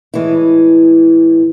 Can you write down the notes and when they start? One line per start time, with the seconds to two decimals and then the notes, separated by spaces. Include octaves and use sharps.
0.14 A2 E3 G#3 E4